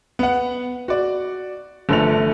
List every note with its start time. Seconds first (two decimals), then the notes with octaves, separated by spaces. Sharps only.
0.19 B3 F#5
0.88 F#4 D5
1.89 G1 D3 F3 A3 F7